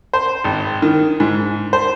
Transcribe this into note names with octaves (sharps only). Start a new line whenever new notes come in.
C5
G#1
D#3
G#2
C5